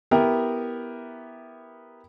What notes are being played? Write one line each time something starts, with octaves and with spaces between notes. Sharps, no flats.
B3 E4 G4 A#4